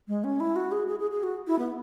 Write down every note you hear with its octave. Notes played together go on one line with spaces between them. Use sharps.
G#3
C#4
E4
F#4
G#4
G#4
G#4
G#4
F#4
E4
B3